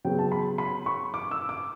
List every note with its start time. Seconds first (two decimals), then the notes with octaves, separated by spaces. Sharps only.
0.05 C#3 F#3 B3 G5
0.19 A5
0.32 B5
0.58 B5
0.86 C#6
1.14 D6
1.31 E6
1.49 D6